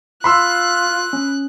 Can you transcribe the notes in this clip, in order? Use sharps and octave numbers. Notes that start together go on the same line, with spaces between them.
F4 B5 C6 E6 F#6
C#4